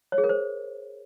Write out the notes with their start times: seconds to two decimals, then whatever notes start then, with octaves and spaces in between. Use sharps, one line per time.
0.12 C#5
0.18 G#4
0.24 A#4
0.29 C5